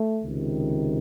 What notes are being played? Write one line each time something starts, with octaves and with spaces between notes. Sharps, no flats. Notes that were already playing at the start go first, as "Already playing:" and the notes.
Already playing: A3
C#2 C3 D#3